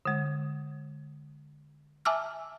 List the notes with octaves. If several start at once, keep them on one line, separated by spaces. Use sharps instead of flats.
D3 G#3
E5 G#5 A5 D6 E6 F6